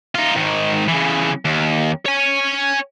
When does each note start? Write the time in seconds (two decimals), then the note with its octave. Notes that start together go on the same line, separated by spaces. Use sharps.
0.15 D#4 F4
0.36 G#2 D#3
0.88 C#3 E3
1.45 D#2
2.06 C#5 G#5